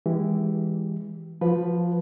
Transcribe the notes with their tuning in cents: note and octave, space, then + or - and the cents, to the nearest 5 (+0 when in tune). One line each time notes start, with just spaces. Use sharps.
E3 +0 G#3 -25 G4 -20
F3 +0 F#4 -35 B4 +0